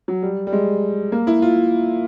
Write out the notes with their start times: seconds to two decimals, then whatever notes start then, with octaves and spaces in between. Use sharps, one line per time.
0.08 F#3
0.23 G3
0.47 G3
0.53 G#3
1.12 A#3
1.27 E4
1.42 F4